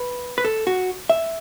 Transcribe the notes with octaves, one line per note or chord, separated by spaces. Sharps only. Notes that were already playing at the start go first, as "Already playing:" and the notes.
Already playing: B4
B4
A4
F#4
E5